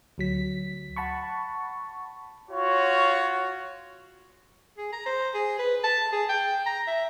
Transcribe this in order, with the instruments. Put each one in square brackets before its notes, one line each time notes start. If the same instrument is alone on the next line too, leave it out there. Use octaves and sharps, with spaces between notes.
[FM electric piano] D2 F#3 B6
F#5 A5 B5 C#6
[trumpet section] F4 F#4 C#5
[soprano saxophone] G#4
A#5
C5
G#4
B4
A5
G#4
G5
A#5
E5